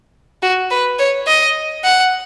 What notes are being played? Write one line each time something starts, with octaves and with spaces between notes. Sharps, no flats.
F#4
B4
C#5
D#5
F#5